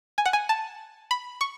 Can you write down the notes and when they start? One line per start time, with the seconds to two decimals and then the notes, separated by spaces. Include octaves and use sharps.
0.18 G#5
0.25 F#5
0.33 G#5
0.49 A5
1.11 B5
1.41 C#6